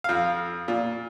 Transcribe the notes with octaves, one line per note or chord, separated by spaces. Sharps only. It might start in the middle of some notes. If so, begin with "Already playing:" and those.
F2 F5
A#2